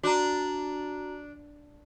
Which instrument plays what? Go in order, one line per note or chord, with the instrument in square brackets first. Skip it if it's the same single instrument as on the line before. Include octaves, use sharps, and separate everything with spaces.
[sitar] D4 [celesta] F#4 A#5